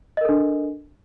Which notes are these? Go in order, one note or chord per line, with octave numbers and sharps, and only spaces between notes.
D4 A4 A#4 D#5